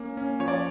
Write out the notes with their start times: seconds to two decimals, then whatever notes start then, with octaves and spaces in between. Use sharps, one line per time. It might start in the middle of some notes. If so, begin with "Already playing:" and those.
Already playing: A#3 C#4
0.17 C#4
0.40 F3 C#5
0.48 D5